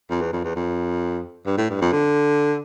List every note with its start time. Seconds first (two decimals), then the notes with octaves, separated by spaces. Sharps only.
0.10 F2
0.21 E2
0.33 F2
0.44 E2
0.56 F2
1.46 G2
1.58 A2
1.70 G2
1.81 F2
1.92 D3